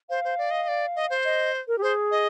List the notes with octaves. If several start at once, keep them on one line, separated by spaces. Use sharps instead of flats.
C5 F5
C5
D5
D#5
D#5
D5
D#5
C5
D#5
A#4
G4
G#4 C5
D#5